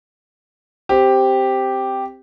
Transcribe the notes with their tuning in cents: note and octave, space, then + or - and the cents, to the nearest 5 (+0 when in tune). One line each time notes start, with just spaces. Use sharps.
C4 +0 G4 +0